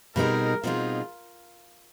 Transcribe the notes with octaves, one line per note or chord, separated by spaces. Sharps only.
B2 G3 C4 D#4 G#4 A#4
B2 G3 C4 D#4 F4 G#4